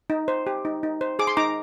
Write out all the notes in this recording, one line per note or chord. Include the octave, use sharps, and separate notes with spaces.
D#4
C5
G4
D#4
D#4
C5
G#4 D6
C6
D#4 A#5 D6